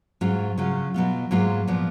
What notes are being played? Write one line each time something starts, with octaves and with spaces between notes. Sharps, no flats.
G#2 F#3 C#4 F4
C#3 F#3 C#4 F4
B2 F#3 B3 F4
G#2 F#3 A#3 F4
A#2 F3 B3